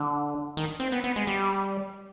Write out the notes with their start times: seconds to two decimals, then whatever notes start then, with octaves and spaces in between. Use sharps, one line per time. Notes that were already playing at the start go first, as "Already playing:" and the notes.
Already playing: D3
0.57 D#3
0.80 C4
0.92 B3
1.04 B3
1.16 G#3
1.27 G3